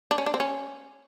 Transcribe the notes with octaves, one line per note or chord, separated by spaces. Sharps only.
D4
C#4
D4
C4
C#4